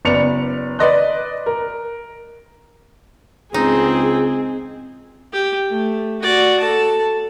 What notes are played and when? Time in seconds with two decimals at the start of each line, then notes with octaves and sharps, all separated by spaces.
0.05 F#1 B3 D5 C#7 F7
0.79 B4 D5 D#5 C6 F#6
1.46 A#4
3.54 C#2 C4 D#4 G#4
5.33 G4
5.69 A3
6.22 F#4 D5
6.60 A4 A5